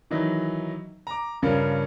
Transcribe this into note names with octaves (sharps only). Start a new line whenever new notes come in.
D#3 E3 F#3 D#4 E4
A#5 D6
G2 C#3 F3 C#4 A#4